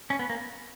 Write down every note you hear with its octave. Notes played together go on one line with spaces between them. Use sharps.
C#4
B3
A#3